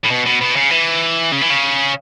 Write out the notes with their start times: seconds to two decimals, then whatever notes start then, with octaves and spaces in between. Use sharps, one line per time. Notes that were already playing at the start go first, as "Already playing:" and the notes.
0.04 A2
0.10 B2
0.26 B2
0.41 B2
0.56 C#3
0.71 E3
1.32 C#3
1.41 E3
1.50 C#3